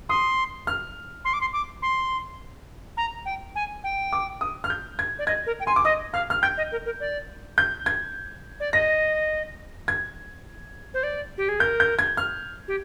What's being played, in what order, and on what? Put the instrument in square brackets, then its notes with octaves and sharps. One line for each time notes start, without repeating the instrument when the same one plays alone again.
[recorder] C6 [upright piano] D#6
[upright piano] F6
[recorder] C6
D6
C6
D6
C6
A#5
G5
G#5
G5
[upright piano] D6
D#6
F6
G6
G#6
[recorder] D5
[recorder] D#5 [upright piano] G#6
[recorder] A#4
G5
[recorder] G#5 [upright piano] C6
[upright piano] D6
[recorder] D#5 [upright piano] D#6
[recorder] F5 [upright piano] F6
[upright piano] F6
[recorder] G5 [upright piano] G6
[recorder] D#5
A#4
A#4
D5
[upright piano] G6
G#6
[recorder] D5
[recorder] D#5 [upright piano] A#6
[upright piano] G#6
[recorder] C5
D5
G4
G#4
[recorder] A#4 [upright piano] G6
[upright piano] G6
G#6
F6
[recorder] G4